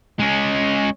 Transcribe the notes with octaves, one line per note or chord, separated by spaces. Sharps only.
G#3 C#4